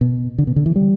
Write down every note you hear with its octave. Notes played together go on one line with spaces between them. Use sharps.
B2
D3
B2
D3
E3
G3